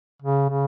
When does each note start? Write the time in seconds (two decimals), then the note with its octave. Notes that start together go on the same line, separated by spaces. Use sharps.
0.22 C#3
0.49 C#3